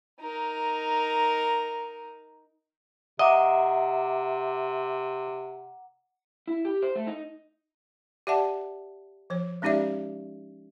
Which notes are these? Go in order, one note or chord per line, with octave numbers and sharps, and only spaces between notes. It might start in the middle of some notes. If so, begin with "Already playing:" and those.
D#4 A#4
C3 D#5 E5 F#5 A#5 D6
E4
G4
C5
A3
D#4
G4 D5 E5 F#5 A5
F3 C#5
G#3 C#4 D#4 G4 D5 E5